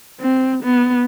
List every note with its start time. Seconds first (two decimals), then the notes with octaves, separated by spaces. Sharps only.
0.20 C4
0.64 B3